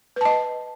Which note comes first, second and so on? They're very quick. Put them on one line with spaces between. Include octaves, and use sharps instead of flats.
B4 A5 D#5